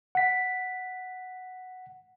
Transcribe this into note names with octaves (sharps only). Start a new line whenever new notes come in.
F#5 B6